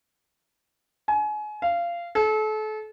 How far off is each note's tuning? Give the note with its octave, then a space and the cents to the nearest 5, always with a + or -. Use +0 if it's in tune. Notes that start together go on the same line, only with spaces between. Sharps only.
G#5 +30
F5 -20
A4 -35